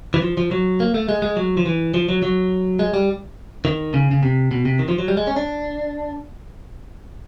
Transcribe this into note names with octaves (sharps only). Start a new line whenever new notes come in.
E3
F3
F3
F#3
A#3
A3
G#3
G#3
F#3
F3
E3
F3
F#3
F#3
G#3
G3
D#3
C#3
C#3
C3
B2
C3
D#3
F3
F#3
G3
G#3
C#4
D4